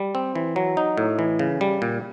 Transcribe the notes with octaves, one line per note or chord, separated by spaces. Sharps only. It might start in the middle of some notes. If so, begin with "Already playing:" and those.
Already playing: G3
C4
E3
F#3
D#4
A2
E3
C#3
G3
A#2